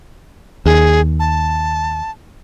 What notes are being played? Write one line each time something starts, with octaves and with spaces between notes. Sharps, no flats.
D#2 G#4
A5